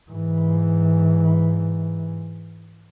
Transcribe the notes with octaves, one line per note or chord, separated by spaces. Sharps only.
G#2 E3